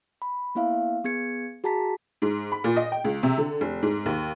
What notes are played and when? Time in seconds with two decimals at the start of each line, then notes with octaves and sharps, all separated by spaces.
0.22 B5
0.55 A#3 B3 E4 E5 F5
1.04 B3 G#4 G#6 C#7
1.64 F#4 G#4 A5 A#5 B6
2.22 G#2
2.52 B5
2.64 A#2
2.76 D#5
2.92 G5
3.04 C#2
3.23 C3
3.38 D3
3.61 F1
3.82 G#2
4.06 D#2